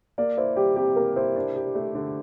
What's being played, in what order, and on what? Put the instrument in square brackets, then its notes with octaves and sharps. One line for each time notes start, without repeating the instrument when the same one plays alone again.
[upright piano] A#3 [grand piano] D5
[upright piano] E4 [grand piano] C5
[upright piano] G3 [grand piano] G4
[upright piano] C3 [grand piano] G4
[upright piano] A#3 [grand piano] A#4
[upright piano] E4 [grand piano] C5
[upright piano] D4
G4
A3
D3